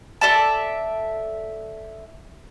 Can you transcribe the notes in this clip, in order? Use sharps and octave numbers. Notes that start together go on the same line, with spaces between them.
A4 D5 E5 A5